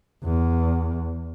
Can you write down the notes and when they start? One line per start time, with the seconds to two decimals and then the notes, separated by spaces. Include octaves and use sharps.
0.25 E2